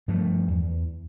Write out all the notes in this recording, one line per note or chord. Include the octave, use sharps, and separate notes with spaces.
G2 F3 F#3 A3
E2